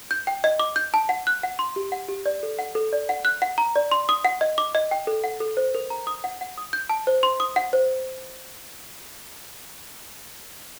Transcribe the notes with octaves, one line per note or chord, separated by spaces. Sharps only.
G6
G5
D#5
D6
G6
A5
F#5
F#6
F#5
C6
G4
F#5
G4
D5
A4
F#5
A4
D5
F#5
F#6
F#5
A#5
D5
C6
D#6
F#5
D#5
D6
D#5
G5
A4
F#5
A4
C5
A#4
A#5
D#6
F#5
F#5
D#6
G6
A5
C5
C6
D#6
F#5
C5